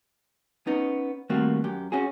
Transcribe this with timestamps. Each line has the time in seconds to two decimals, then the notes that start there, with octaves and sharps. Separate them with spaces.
0.67 B3 C#4 D#4
1.30 D#3 G3 A3 A#3 C4 F#4
1.64 F#2 G4
1.92 C#4 F#4 G#4